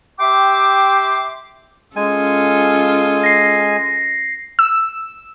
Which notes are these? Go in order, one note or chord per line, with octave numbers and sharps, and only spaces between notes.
G4 E5 G5 C6 D6
G#3 C#4 F4 A4 G#5
A#6 C7
E6